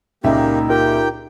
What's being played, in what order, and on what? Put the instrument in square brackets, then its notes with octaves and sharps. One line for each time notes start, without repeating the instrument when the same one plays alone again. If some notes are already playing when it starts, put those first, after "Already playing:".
[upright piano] C#2 A#2 E5 [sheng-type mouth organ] A#3 G4 [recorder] D#4
[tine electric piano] F4 A#4 [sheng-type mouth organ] G4 G5